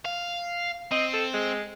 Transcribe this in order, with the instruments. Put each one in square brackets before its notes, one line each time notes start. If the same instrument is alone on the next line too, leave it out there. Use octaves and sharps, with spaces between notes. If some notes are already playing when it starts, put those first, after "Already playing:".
[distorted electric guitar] F5
[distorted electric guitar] C4 [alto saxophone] D#5
[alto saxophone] A4
G#3